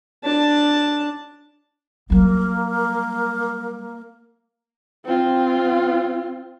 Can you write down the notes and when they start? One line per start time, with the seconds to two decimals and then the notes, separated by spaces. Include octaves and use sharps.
0.24 D4 A5
2.10 F#3 G3 A#3
5.06 C4 F4